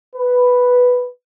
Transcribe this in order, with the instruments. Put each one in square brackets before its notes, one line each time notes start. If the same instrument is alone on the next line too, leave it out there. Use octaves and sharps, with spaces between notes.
[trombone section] B4